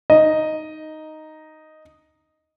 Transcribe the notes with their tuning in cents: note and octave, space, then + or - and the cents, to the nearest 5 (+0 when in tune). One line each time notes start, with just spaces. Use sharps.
D#4 +0 D#5 +0